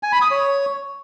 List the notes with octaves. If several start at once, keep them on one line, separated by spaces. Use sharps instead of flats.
G#5
B5
D#6
C#5